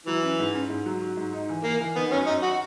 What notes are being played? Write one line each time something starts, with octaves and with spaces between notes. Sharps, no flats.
E3 F#3
C#4
G#2
C#4
G#2
F#3
F#4
G#2
D#4
E3
E3 A#3
E3
D#3 B3
F#2 C#4
F#2 D#4
F#4